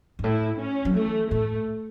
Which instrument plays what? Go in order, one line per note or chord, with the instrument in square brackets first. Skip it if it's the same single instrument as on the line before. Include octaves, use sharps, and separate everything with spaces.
[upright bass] G2
[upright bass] A2 [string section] E4
[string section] C#4
[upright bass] F#3
[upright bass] E3 [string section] A3
[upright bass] A2 [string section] A3